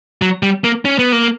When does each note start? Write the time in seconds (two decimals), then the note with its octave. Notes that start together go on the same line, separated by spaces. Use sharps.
0.22 F#3
0.43 G3
0.64 A#3
0.85 C#4
0.99 B3
1.12 A#3